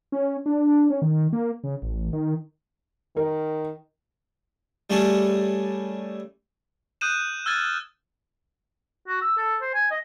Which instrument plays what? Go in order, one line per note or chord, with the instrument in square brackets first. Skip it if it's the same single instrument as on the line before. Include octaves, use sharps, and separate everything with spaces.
[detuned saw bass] C#4
D4
C#4
D#3
A#3
C#3
A1
D#3
[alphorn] D#3 [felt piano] A#4
[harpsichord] G3 A3 C#4 G#4 A4
[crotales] D#6 F#6 G6 D#7 E7
E6 F6 G#6 A6 D#7
[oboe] F#4
E6
A4
C5
G#5
D#5